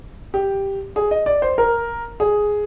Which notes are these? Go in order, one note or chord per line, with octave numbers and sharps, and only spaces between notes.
G4
G#4
D#5
D5
C5
A#4
G#4